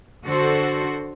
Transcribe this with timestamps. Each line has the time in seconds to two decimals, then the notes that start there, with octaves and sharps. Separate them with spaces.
0.25 D3 F#4 A4 C5